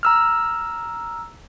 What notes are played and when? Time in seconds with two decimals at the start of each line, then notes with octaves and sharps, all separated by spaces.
0.03 A#5 E6 F6